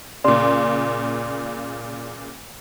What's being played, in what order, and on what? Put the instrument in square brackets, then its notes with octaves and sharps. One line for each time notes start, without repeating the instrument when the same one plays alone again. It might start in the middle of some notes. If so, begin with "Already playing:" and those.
[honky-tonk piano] A#2 C#3 [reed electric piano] D5 C6